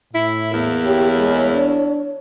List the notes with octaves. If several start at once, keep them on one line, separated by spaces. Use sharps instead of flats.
A2 E4
E2 A#3 E4
G4 C#5
G#3
D4